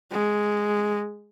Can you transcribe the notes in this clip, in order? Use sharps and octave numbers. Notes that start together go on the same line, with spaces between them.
G#3